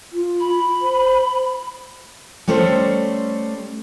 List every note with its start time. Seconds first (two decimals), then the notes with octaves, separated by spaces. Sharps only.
0.13 F4
0.40 B5
0.82 C5
2.47 G3 A3 C#4 A4 C5